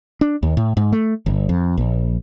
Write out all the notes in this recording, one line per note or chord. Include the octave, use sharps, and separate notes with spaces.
D4
D#2
A2
G#2
A3
G1
F2
A#1